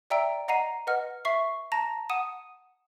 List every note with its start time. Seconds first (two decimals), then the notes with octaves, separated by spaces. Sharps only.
0.10 D5 E5 G5 A#5 E6 D7
0.48 D#5 F#5 A#5 C7 D#7
0.87 B4 D#5 F#5 F6
1.25 E5 C#6 C7
1.72 A5 A#5 A#6
2.09 F#5 D#6 D#7 E7